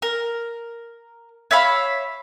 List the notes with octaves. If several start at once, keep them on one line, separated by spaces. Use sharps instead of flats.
A#4
C#5 E5 F5 B5